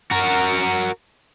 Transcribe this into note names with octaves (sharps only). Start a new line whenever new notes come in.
F#4 A#4